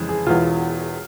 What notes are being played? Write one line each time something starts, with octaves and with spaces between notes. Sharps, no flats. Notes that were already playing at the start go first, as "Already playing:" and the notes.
Already playing: F2 C#3 E3 G#3
G#4
E1 E2 E3 F4